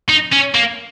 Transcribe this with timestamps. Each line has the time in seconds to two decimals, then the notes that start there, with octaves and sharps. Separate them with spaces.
0.09 D#4
0.32 C#4
0.54 A#3